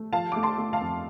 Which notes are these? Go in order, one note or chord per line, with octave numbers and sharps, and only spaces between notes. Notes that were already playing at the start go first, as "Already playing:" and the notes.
Already playing: A3
F3 F5 A5
A3 D6
A5 C6
A3
F5 A5
F2